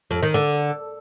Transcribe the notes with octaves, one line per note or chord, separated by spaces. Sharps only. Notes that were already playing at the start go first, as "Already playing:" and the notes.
F2
D#3
D3